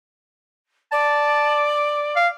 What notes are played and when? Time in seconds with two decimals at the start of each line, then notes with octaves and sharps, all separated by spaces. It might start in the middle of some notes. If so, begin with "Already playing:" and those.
0.92 D5 A5
2.16 F5